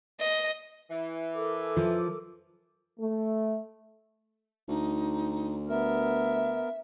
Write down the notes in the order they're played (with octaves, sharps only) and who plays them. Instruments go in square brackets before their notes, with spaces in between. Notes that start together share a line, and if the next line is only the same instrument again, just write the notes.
[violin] D#5
[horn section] E3
[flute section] A4 A#4 D6
[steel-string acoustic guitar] F3
[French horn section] A3
[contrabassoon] D2 [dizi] D#4
[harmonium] B3 A#4 [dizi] E5